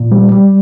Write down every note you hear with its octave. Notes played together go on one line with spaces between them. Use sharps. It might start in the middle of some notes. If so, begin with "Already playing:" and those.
Already playing: A#2
G3
G3